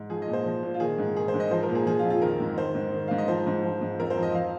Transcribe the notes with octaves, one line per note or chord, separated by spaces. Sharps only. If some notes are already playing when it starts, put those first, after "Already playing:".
Already playing: G#2
F3 G#4
D#5
A#2
C5
F3
A#2
F4
D#3 G#4
G#2
D#3 G#4
C5
G#2
D#5
F3 C5
A#4
A#2
G#4
F3 G#4
F4
F2
F4
D#3 A#4
G#2
D#3 C5
G#2
D#3
G#2 F5
D#5
F3 C5
G#2
F3
G#2
F2 A#4
C5
F3
D#5
F3 F5